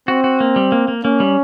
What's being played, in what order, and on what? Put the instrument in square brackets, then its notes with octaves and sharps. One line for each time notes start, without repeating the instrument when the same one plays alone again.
[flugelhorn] C4 [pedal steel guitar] F#4
[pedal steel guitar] F#4
A#3
G3
A#3
A#3
[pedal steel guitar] A#3 [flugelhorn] C#4
[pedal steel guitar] G3